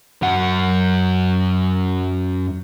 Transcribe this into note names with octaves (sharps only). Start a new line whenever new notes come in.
F#2 F#5